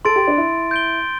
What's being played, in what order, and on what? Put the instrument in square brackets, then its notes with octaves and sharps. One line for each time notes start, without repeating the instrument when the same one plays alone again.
[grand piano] A4 [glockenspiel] C6 A6 D7
[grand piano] G4
D4
E4
[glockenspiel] G6 D7 G7